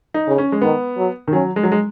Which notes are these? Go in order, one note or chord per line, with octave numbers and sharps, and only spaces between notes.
D#4
C#3
C#4
G#3
D#3 B3
F#3
D#3
F#3 C#4
G#3
F#3
G#3